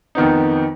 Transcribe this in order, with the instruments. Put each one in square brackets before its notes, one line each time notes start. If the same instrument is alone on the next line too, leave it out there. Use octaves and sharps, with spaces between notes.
[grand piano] F2 D#3 B3 D#4